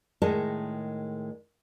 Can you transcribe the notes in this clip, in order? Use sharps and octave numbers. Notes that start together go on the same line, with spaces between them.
A2 D#3 G#3 A#4 D#5 A5